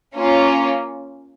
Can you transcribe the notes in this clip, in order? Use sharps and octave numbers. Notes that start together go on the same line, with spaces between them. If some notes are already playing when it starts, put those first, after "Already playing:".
A#3 C#4 F4